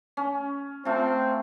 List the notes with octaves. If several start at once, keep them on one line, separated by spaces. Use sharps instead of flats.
C#4
A3 C4 F4